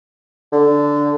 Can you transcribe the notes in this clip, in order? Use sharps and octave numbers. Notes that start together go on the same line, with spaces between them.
D3